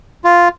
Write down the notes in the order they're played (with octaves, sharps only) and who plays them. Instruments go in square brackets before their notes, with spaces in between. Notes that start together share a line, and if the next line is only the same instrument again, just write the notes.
[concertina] F4